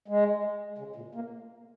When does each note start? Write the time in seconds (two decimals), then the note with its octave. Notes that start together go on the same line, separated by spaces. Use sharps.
0.08 G#3
0.78 C#3
0.96 A#2
1.15 A#3